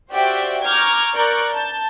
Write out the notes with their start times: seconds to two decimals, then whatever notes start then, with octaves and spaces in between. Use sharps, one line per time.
0.13 F#4 G4 C5 D5 E5 G5
0.65 A#5 C#6 D6 F6 G6 G#6
1.14 A#4 D5 A#5 C#6 F#6 G6
1.52 A5 G6